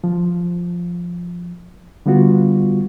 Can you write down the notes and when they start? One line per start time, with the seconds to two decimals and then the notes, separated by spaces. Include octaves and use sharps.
0.04 F3
2.06 D3 G3 B3 F4 F#4